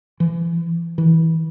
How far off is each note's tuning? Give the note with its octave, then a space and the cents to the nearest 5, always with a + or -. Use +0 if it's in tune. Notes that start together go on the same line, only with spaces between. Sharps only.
E3 +35
E3 -20